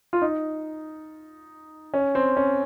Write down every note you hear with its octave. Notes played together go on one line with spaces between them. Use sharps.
F4
D#4
C#4
C4
C#4